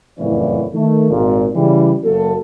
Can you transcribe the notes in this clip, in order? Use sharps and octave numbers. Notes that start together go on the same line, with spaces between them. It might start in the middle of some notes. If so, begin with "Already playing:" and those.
F#1 F2 A2 E3 C#4 D5
D#3 A3
G#1 A#2
C#3 E3 G3
F#1 F#3 A#3 A4